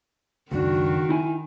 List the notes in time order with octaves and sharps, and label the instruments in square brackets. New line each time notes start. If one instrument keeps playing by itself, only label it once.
[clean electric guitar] C#2 F#2 D4 [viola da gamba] D#3 [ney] F#4
[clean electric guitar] D#4 E4 G#5